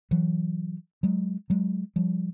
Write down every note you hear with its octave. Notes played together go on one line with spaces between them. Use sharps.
E3 F#3
F#3 G#3
F#3 G#3
F3 G3